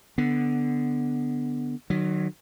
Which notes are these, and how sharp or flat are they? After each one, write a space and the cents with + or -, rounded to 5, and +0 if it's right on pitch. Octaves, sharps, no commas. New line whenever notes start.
D3 +0 B3 +0
D#3 -35 F#3 +0